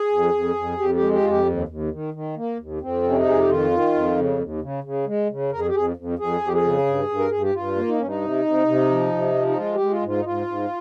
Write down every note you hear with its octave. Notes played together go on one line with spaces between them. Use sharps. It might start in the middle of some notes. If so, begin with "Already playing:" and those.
Already playing: G#4
F2
F2
F2
F2 G4
G4
G#3
G4
F2 F4
G4
D#2
D#2
D#3
D#3
A#3
D#2
F2 C4
C3
C#4
D#4
F2 G#4
G4
D#3 F4
D#3
F2
C#3
D#2
C#3
C#3
G#3
C#3
F2 A#4
G#4
G4
F2 G#4
F2
F2 G#4
F2
G4
G#4
C#3
G2
G2
A#4
G2 G#4
G4
G2 F4
A#3
D#4
G2 C#4
D#4
C3
C3
C3
F3
C3
F3
D#4
G#3 F4
G4
G#3
F4
G#2
F4
D#4
G#2 F4
G#2